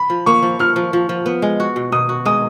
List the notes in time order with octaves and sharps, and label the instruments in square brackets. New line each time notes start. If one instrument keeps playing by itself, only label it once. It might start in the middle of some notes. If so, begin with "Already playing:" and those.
Already playing: [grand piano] B5
[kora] F3
[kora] A#3 [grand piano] C#6
[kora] F3
[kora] F3 [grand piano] F6
[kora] F3
F3
F3
B3
G#3
F#4
B2
[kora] B2 [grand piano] D#6
[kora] F#4
[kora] G#3 [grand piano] D#6